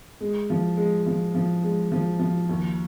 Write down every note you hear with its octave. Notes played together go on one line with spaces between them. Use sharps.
G#3
F3
G#3
F3
F3
G#3
F3
F3
D#2